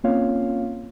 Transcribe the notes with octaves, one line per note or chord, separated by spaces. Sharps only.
A#3 C4 C#4 F4 C#5 F5